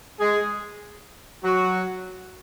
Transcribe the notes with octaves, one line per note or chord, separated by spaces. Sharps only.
G#3 G#4
F#3 F#4